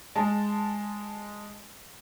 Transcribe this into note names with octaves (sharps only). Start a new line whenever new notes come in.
G#3 A5